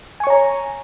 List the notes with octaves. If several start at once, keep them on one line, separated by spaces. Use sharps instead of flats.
C#5 G#5 A#5 C#6